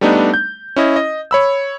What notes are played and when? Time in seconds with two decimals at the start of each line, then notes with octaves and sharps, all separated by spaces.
0.01 G3 A3 B3 D4 D#4
0.34 G6
0.76 C#4 E4 D#5
0.96 D#5
1.31 C#5 B5 E6